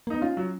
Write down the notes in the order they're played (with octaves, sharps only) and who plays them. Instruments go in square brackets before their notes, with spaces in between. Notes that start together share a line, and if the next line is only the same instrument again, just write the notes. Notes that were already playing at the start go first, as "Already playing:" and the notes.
[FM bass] A#3
[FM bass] B3 [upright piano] D#4
[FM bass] C#4 [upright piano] F4
[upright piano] F#3